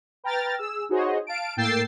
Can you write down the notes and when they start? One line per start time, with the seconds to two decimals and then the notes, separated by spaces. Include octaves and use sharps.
0.24 B4 G5 A#5 F6 A6
0.58 G#4 E6
0.89 D#4 F#4 G#4 C5 C#5 D#5
1.27 F5 A5 D7
1.57 A2 A#3 G5 E6 A6 C7